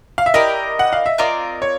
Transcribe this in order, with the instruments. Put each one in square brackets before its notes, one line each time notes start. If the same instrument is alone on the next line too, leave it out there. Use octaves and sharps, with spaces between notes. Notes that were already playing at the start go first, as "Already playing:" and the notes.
[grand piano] F5
E5
[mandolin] E4 G4 A#4 D5 [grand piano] D#5
[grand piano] F#5
F5
E5
[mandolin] C4 F4 A#4 D5 [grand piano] D#5
[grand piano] C#5